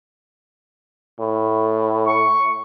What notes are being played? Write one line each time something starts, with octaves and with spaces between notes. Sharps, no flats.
A2
C#6